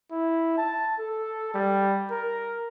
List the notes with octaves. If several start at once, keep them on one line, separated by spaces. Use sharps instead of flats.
E4
A5
A4
G3
A#4